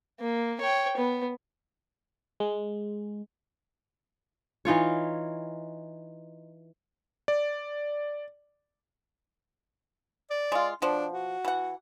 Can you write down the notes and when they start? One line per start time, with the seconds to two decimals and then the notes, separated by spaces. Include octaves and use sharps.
0.20 A#3
0.61 C#5 G5
0.97 B3
2.40 G#3
4.65 E3 D#4 F4 C#5
7.28 D5
10.30 D5
10.52 G#3 F4
10.82 B2 F3 D4
11.13 F#4
11.45 E3 F#5